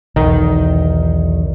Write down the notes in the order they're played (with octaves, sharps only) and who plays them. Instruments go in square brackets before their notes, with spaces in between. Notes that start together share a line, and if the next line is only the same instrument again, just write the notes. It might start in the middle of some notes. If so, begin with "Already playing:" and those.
[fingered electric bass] B1 E2 [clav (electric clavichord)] D#3 D#4